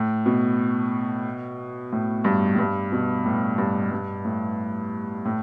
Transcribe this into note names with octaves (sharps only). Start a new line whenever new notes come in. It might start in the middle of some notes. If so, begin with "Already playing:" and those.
Already playing: A2
B2
A2
G2
A2
G2
B2
A2
G2
G2
A2
A2